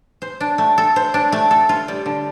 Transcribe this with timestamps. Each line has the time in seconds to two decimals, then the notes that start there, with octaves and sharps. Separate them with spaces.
0.22 C5
0.41 D4
0.58 A3
0.78 A4
0.96 C5
1.14 D4
1.32 A3
1.51 A4
1.69 F4
1.88 G3
2.06 D3